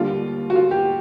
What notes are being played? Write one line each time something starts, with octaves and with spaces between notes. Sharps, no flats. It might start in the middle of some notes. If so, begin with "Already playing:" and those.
Already playing: D#2 D3 G3 F4
F#4
F4
G4